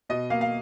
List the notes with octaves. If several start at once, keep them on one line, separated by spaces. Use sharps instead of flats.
B2 D#5
A#3 F5
F5